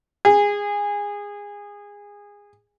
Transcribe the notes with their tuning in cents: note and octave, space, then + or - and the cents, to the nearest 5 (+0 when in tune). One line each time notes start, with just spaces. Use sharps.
G#4 -20